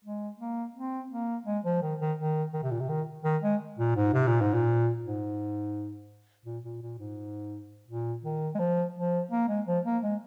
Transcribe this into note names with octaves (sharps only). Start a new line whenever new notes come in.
G#3
A#3
C4
A#3
G#3
F3
D#3
D#3
D#3
D#3
C3
A#2
C3
D#3
D#3
G#3
A#2
G#2
C3
A#2
G#2
A#2
G#2
A#2
A#2
A#2
G#2
A#2
D#3
G#3
F3
F3
A#3
G#3
F3
A#3
G#3